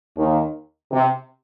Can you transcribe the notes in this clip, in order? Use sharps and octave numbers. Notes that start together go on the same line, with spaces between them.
D#2 D#3
C3